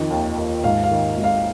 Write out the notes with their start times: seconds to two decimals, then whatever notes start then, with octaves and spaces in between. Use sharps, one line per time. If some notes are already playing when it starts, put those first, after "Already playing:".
Already playing: F2 D#3
0.11 D#2
0.38 D#2
0.64 G#2 F5
0.84 F5
0.91 D#3
1.17 G#1
1.24 F5